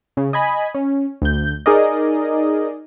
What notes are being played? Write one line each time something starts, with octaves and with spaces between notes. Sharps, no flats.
C#3
D#5 G#5 B5
C#4
D2 G6
D#4 G#4 A#4 D5 D#5